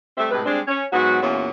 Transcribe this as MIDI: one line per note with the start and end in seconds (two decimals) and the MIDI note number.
0.18 0.26 55
0.18 0.26 57
0.18 0.26 60
0.18 0.26 76
0.31 0.42 45
0.31 0.42 48
0.31 0.42 56
0.31 0.42 71
0.45 0.59 55
0.45 0.59 56
0.45 0.59 60
0.45 0.59 62
0.67 0.84 61
0.67 0.84 73
0.93 1.21 44
0.93 1.21 54
0.93 1.21 59
0.93 1.21 66
1.22 1.50 40
1.22 1.50 46
1.22 1.50 52
1.22 1.50 61
1.22 1.50 65
1.22 1.50 66